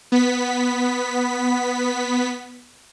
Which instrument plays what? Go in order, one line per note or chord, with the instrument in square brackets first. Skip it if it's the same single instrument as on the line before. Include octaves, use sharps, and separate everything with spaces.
[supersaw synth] B3 B6